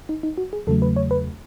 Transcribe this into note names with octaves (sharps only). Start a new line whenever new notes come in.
D#4
D#4
F#4
G#4
E2 C#3 F#3 A3 A4
B4
C#5
B4